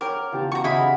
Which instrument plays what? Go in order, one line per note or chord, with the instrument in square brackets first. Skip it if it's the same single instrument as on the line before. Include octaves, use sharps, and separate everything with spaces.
[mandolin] A#4 [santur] C#5 G5 D6
[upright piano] E2 C#3 [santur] F4 G4 A5
[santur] F4 F#4 D6 [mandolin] A#5 C#6
[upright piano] C#3 [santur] G#3 [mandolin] D#4 E4 B5